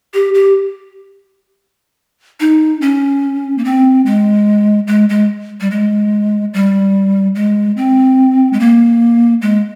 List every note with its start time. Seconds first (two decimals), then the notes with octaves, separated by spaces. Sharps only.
0.14 G4
0.34 G4
2.40 D#4
2.81 C#4
3.58 A#3
3.65 C4
4.06 G#3
4.88 G#3
5.09 G#3
5.60 G3
5.71 G#3
6.54 G3
7.35 G#3
7.77 C4
8.53 G#3
8.60 A#3
9.42 G#3